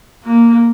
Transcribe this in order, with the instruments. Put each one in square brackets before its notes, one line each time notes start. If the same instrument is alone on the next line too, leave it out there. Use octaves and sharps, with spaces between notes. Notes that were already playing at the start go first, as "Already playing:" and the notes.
[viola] A#3